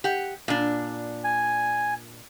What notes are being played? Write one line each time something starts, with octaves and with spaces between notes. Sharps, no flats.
G4 F#5
A#2 D4
G#5